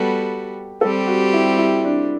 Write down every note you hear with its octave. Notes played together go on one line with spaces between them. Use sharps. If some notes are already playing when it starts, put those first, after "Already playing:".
Already playing: G3 B3 F#4 G4 A4
G3 C4 G4 A4
F#4
E4
E4
D4